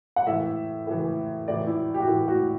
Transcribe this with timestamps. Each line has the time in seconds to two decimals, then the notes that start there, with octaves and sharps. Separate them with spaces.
0.16 F#5
0.26 A2 E3 E5
0.87 A2 E3
1.48 A2 E3 D5
1.67 E4
1.94 G4
2.00 F#4
2.08 A2 E3 E4
2.28 F#4